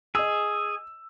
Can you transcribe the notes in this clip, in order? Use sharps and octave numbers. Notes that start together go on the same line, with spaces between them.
G#4 D#5 E6